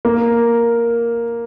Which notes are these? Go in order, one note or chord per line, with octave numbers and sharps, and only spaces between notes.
A#3